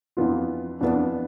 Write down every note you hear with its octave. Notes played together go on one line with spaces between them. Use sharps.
F2 E3 B3 F4
F2 E3 B3 D4